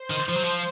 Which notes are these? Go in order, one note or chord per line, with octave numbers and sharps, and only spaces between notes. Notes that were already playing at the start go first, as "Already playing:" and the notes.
Already playing: C5
D#3
F3
F#3
F3